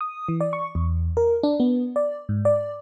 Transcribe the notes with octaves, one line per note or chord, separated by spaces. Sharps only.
D#6
E3
D5
C#6
E2
A#4
D4
B3
D5
G#2
D5